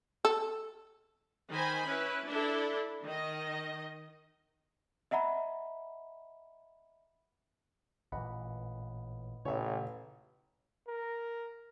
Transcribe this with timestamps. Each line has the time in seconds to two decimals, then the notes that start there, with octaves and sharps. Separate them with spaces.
0.25 A4
1.51 D#3 C5 G#5 B5
1.87 C#4 E4 B4
2.27 D4 E4 A4
3.04 D#3 D#5
5.11 D#5 E5 F#5 A#5 B5
8.12 A1 A#2 E3 D#5 F#5 B5
9.45 A1 A#2 C#3 C#5 E5
10.88 A#4